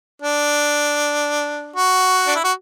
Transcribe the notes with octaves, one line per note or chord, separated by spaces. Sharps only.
D4
F#4
D4
E4
F#4